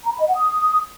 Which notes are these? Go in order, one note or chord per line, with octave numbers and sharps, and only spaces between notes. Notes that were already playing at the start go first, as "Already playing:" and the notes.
A#5
B5
D#5
F#5
D#6